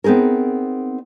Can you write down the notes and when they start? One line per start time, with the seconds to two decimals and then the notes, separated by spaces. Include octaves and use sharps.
0.04 B3 C4 D#4 G#4 A#4